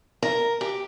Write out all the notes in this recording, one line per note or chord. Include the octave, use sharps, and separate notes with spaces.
A#4
G4